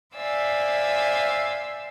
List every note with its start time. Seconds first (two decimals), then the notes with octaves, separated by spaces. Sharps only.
0.15 C5 D5 E5 F5 G#5 E6